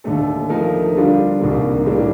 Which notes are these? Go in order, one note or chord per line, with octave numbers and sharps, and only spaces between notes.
D#2 D3 A3 D#4 A4
F3 A3 D#4 A#4
D3 G3 D4 F4
C2 C3 D#3 A#3
A2 G3 A#3 D4